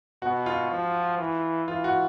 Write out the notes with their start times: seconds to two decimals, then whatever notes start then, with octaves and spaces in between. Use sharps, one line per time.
0.22 B2 F#4
0.46 F4
0.70 F3
1.19 E3
1.68 E3 F4
1.84 F#4